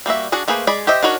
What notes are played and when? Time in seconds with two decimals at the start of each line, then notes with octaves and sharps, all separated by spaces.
0.06 G3 A#3 F#4 E5
0.32 D4 F#4 G#4 F#5
0.48 A3 A#3 G#4 B4 C5
0.67 G#3 G#4 D5 B5
0.87 G4 C5 D#5 E5
1.03 D4 D#4 F#4 A#4 C#5